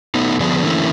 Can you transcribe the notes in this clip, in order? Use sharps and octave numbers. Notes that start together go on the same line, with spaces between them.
A3 B3 D#4
D3 F3 B3 D4 G#4
D3 E3 A3 A#3 C#4 E4